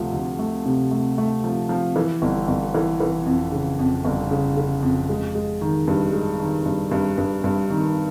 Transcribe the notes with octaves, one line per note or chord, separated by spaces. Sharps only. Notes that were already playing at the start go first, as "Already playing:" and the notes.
Already playing: D2 C3 F3 A3
D2
A3
C3
A3
A3
F3
F3
E3
G1
G1
E3
E3
F2
C#3
F2
G1
C#3
C#3
F2
G#3
G#3
D#3
G2
G#3
D#3
G2
G2
G2
G2
D#3